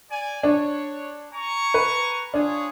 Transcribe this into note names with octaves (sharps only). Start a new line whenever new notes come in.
D5 G#5
D4 C#5
G#5 A#5 C#6
B4
D4 F4 G#4 C#5